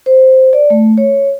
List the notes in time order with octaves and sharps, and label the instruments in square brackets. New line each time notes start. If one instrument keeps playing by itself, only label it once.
[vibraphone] C5
D5
A3
C#5